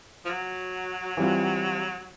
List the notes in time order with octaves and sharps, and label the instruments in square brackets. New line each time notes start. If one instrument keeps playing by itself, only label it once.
[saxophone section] F3
F#3
[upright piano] E3 G3 C4 F4